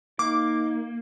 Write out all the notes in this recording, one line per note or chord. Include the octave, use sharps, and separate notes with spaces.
A#3 D#4 D6